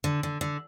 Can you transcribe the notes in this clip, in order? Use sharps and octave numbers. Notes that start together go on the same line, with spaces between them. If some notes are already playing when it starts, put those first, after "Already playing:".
D3
D3
D3